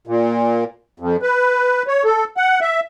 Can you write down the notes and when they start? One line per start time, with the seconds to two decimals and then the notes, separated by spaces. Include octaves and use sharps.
0.07 A#2
1.00 F2
1.22 B4
1.87 C#5
2.04 A4
2.37 F#5
2.61 E5